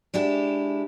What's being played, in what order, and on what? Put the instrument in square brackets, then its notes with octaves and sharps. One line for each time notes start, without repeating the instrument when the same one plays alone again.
[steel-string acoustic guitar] G#3 D4 E4 G4